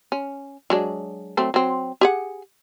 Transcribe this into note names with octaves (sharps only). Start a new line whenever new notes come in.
C#4
F#3 G#3 D4
F#3 A3 C4
F#3 C4
G4 G#4 F#5